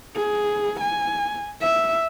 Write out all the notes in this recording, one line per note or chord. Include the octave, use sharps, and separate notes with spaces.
G#4
G#5
E5